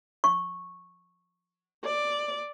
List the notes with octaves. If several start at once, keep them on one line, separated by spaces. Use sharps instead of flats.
C#6
D5